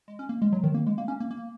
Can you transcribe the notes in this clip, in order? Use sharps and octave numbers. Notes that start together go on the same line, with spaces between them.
G#3
C#4
A#3
G#3
F#3
D#3
A#3
G#3
A#3
C#4
A#3
A#3